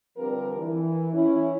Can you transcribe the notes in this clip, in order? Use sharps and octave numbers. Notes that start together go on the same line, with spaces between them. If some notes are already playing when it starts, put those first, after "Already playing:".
D3 F3 G3 C4 A#4 B4
E3
C#4 E4